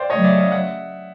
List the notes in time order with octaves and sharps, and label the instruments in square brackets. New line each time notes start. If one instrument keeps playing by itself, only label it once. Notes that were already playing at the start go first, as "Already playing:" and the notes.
Already playing: [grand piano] C5 D5 F5 G5
[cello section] C#3 F#3 A3 [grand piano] C#5 D#5
[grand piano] D5 E5
D#5 F5
E5 F#5